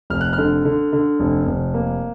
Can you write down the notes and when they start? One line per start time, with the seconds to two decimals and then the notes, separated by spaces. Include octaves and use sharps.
0.10 F1 F6
0.21 F#6
0.33 F6
0.38 D3
0.65 D3
0.93 D3
1.20 F1
1.47 F1
1.74 A#3